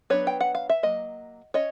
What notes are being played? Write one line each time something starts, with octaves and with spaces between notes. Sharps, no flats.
F#3 B3 D4 B4 C#5
G5
F#5
F5
E5
F#3 A#3 D#5
C#4 C#5 D#5